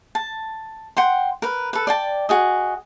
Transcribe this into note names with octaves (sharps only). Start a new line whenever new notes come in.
A5
F#5 G5 C6
A#4 B4
A4 B4
D5 G5 A5
F#4 G#4 D#5